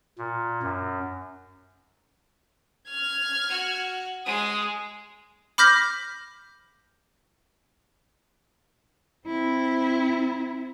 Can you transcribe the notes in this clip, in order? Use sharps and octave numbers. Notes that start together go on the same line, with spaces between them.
A#2
F#2
F6 G#6
F#4
G#3 G#4 D#6
B5 D6 F6 G6 A#6 B6
C4 E4